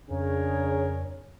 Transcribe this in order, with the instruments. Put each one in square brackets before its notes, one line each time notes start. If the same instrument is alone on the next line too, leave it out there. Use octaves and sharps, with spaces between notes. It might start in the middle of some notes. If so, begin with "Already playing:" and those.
[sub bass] F2 [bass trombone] C#3 [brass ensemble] D4 G#4 A#4 [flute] C#5